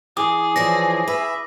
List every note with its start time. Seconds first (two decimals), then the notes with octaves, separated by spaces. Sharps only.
0.17 E3 G#4 D6 D#6
0.56 E3 F3 E4 C#5 D5 A#6
1.08 B4 E5 B5